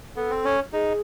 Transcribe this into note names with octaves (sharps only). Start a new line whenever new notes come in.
B3 A4
C4
C#4
D#4 G#4